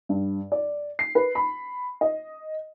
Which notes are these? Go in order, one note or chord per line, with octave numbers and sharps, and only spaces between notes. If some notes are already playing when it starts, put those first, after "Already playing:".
G2
D5
C7
B4
B5
D#5